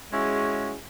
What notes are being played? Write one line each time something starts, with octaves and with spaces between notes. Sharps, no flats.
G#3 C#4 E4 F#4 G#4